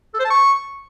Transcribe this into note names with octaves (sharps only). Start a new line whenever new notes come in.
A4
C5
A5
C#6